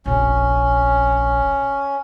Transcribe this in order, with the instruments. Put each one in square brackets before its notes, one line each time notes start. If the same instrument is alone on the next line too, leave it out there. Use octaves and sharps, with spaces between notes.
[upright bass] F1 A#1 [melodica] C#4